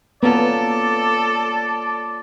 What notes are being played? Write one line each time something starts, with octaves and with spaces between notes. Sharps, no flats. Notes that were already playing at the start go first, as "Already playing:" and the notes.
A#3 B3 C#4 F4 A4 D5